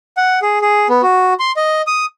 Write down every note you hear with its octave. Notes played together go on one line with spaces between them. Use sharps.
F#5
G#4
G#4
B3
F#4
C6
D#5
D#6